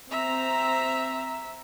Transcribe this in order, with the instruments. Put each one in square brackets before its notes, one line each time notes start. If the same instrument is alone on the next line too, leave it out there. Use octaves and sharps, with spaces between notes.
[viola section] C4 A#5 [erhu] E5